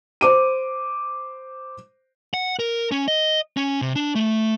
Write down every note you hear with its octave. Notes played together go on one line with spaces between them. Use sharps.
C5 D6 D#7
F#5
A#4
C#4
D#5
C#4
C3
D4
A3